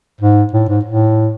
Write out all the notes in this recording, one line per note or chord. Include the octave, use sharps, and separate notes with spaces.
G#2
A2
G#2
A2